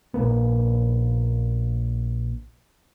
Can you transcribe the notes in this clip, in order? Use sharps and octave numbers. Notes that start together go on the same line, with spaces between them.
A#1 A#3 B3